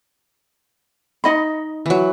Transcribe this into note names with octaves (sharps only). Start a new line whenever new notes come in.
D#4 D#5 B5
E3 F#3